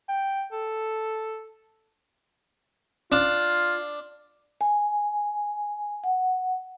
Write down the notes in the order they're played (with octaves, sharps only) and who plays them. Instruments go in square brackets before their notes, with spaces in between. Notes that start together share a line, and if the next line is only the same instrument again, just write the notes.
[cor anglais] G5
A4
[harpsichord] D4 [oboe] F4
[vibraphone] G#5
F#5